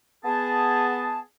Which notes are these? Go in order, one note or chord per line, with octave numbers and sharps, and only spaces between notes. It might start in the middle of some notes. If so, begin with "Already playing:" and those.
B3 G#4 A5